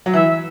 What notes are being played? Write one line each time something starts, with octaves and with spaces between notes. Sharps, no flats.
F#3
E3 E5